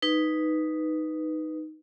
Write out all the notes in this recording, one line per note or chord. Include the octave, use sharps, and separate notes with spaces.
D#4 B4